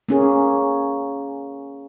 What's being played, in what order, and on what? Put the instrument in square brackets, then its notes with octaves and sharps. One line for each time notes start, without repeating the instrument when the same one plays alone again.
[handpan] A#3 C#4 G#4